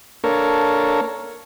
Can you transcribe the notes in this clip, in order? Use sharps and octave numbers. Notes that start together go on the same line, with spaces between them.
A#3 D4 A4 A#4 C#5